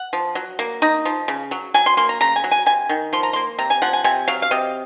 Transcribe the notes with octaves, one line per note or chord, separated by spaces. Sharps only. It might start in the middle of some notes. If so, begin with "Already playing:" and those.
Already playing: F#5
F3
F#3
A#3
D#4 A#5
F3
C#3
F#3
F#3 G#5
C6
A#3 C6
A#5
C#3 A#5
G#5
F#3
G#5
C3 G#5
D#3
F3 C6
A#5
A#3 C6
C3 A#5
G#5
F3 F#5
G#5
C3 G#5
F#3 F5
F5
C3 D#5